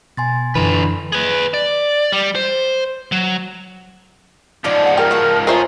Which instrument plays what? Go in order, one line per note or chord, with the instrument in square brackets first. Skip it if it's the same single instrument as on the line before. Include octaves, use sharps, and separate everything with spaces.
[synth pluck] B2 [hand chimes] G#5 C6 A6
[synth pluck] F#2 A#5 E7 [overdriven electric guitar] D3 B4 [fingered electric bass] E3
[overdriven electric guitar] G#4 B4
D5
G3
C5
F#3
[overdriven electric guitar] G#2 F3 [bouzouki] G#3 D4 D5
[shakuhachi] F#5
[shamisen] G4 [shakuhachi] A#4
[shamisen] F#4 [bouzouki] F#5 A5
[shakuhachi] F4 [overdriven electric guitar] G#4 C#5 [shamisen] A#4 C5 E5 [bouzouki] A#5